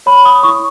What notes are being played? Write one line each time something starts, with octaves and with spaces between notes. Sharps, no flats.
C#5 B5
D#6
E4 C#6